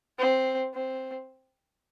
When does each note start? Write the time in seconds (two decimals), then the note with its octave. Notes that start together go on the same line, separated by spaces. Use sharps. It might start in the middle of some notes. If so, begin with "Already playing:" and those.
0.19 C4
0.74 C4